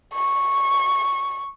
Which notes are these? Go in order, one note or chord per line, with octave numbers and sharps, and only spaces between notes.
C#6